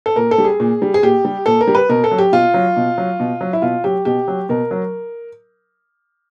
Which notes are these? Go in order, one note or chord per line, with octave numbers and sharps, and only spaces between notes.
A4
A#2 A#4
A4
G3
G#4
A#2
G3
G#4
A#2 G4
G3
A#2 A4
A#4
G3
B4
B2 A#4
A4
F#3
G4
B2 F4
F#3
B2
F#3
B2
F#3
E4
B2 F4
F#3 G4
B2 G4
F#3
B2 A#4
F#3